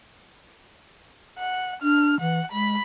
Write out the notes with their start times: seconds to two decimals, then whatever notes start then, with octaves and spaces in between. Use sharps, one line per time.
1.39 F#5
1.83 D4 F6
2.21 E3 F#5
2.52 G#3 B5